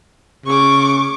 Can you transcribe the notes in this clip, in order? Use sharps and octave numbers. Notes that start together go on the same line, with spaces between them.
C#3 C#6 D6